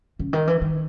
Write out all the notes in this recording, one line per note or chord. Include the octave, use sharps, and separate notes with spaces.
C#3
D#3
E3
D#3